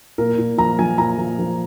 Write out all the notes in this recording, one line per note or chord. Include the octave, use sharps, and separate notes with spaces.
A#2 A#4
A#2
F3 A#5
F3 G#5
A#2 A#5
F3
F3